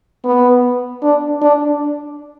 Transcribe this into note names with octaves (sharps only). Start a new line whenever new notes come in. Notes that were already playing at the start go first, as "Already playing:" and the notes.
B3
D4
D4